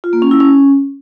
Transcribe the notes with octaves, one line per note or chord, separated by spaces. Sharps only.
F4
A#3
C#4
E4
C#4